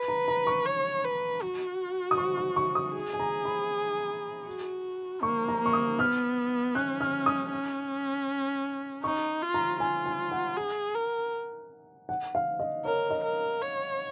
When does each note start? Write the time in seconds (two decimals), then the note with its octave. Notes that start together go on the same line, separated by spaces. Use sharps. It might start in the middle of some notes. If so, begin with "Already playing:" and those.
Already playing: B4
0.08 A#5
0.28 A#5
0.47 C#6
0.65 C#5
1.04 B4
1.42 F#4
2.11 D#6
2.18 C#6
2.37 C#6
2.56 C#6
2.75 D#6
2.95 G#4
3.13 G#5
3.20 A#5
3.45 B5
4.47 F#4
5.23 A#3 C#6
5.49 A#5
5.61 A#3 C#6
5.73 D#6
5.99 B3 F6
6.75 C#4 F#6
7.01 F6
7.26 D#6
7.51 C#4
9.04 D#4 C#6
9.42 F4
9.54 A#5
9.80 F4 G#5
10.06 G#5
10.31 F#5
10.56 G#4
10.94 A#4
12.09 F#5
12.35 F5
12.60 D#5
12.85 A#4 C#5
13.10 D#5
13.23 A#4
13.62 C#5